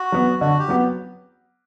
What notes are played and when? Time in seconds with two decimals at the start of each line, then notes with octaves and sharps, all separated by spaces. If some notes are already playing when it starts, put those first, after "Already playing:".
Already playing: F#4
0.12 F#3 B3
0.41 D3 F#4
0.59 G4
0.68 F#3 B3